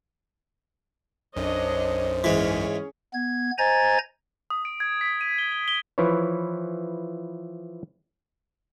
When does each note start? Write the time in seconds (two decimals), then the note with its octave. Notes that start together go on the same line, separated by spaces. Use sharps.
1.36 B1 F#2 D4 C5 C#5 D#5
2.24 G#2 E3 C#4 G#4 C#5
3.14 B3 G#6
3.58 C5 D#5 G#5 A#5 G#6 A6
4.50 D#6
4.65 D7
4.80 G#6
5.01 B6
5.21 D#7
5.38 G7
5.52 G7
5.68 G7
5.98 E3 F3 E4 B4 C#5